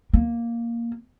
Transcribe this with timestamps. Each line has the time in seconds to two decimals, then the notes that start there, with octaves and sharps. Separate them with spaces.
0.13 A#3